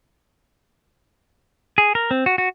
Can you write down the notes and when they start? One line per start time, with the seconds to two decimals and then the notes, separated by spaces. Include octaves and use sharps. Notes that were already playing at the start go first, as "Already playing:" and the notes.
1.78 G#4
1.95 A#4
2.11 C4
2.26 F#4
2.38 F#4